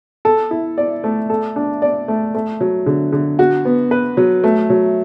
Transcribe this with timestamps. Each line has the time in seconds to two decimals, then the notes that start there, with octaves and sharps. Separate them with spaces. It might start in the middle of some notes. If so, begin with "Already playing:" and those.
0.25 A4
0.51 E4
0.78 D5
1.04 A3
1.30 A4
1.56 D4
1.82 D5
2.08 A3
2.34 A3
2.61 F#3
2.86 D3
3.12 D3
3.39 F#4
3.65 B3
3.91 B4
4.17 F#3
4.44 A3
4.70 F#3